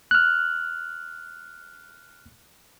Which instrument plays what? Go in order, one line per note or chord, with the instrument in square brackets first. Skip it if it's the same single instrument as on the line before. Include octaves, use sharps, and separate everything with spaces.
[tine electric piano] F6 F#6